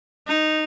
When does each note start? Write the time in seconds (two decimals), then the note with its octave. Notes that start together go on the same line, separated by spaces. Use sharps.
0.27 D#4